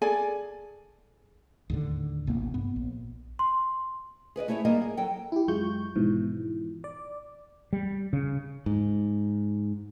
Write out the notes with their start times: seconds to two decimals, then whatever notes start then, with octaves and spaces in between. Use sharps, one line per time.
0.02 G#4 A4 D5 G#5
1.70 D#2 A2 D3
2.27 A1 C3 A#3 B3
2.54 G2 B3
2.76 A#1
3.39 C6
4.36 G#4 B4 D5 D#5
4.48 A3 E4 G#4 C5 C#5 E5
4.65 G3 A#3 D#4 G#4 D5 D#5
4.82 G#4
4.97 F#3 A4 G5
5.32 E4 G4
5.48 F#2 G#3 F4 C#6 G6
5.95 G#2 B2 E3 F3
6.84 D5
7.73 G3
8.13 C#3
8.66 G#2